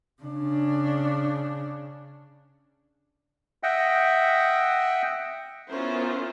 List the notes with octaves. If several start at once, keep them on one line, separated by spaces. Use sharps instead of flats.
C#3 D4
D#5 E5 F#5 G5
B3 C#4 E4 F4 A#4 C5